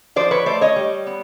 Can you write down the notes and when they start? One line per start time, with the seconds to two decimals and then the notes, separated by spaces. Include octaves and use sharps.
0.16 F3 C5 D5
0.31 B4 C#5
0.46 A3 C5 D5
0.61 C#5 D#5
0.76 G3
1.07 B3